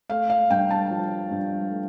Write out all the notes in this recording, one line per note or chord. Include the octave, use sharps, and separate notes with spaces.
A3 F5
F5
G2 G5
A5
F3
G2
A3